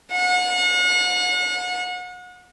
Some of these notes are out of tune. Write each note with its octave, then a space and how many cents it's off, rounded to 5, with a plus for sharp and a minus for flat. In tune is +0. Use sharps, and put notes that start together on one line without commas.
F#5 -40